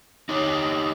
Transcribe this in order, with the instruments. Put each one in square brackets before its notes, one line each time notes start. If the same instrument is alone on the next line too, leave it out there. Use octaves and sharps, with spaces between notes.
[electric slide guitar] D#4 G4 C#5